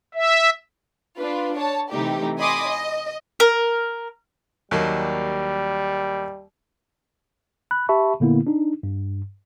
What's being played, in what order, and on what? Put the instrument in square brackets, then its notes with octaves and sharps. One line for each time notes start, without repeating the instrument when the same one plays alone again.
[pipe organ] E5
[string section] D4 F4 B4
C#5 A5
C3 E3 A3 D#4 G4
D#5 G#5 B5 C6 D6 D#6
D#5
[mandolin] A#4
[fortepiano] D#2 F#3 A#3 [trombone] G3
[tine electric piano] B5 F#6
G4 E5 A5 B5 C#6
A#2 D3 A#3 B3 E4
D4 D#4
G2